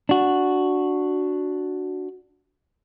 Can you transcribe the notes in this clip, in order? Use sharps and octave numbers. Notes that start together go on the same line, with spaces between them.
D4 F#4